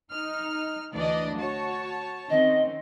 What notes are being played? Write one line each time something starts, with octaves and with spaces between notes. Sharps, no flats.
D#4 F6
D2 E3 D4 D5 D#5
F#4 C#5 A5
D#3 C4 C#4 D#5